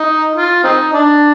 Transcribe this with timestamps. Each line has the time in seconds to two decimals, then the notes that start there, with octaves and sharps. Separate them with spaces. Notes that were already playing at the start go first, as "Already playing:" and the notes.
Already playing: D#4
0.35 F4
0.64 C4 D#4
0.93 D4